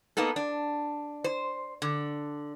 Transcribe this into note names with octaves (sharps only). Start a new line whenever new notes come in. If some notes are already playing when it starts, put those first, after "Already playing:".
A#3 B3 D#4 A4
D4
C5
D3